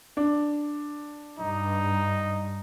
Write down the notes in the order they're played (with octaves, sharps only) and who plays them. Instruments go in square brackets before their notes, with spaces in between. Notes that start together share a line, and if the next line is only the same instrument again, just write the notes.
[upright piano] D4
[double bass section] G2 [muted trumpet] D#4